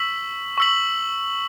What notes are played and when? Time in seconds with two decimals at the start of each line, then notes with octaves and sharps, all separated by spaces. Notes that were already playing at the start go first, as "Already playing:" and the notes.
Already playing: C#6 E6 B6 F#7
0.58 C#6 E6 B6 F#7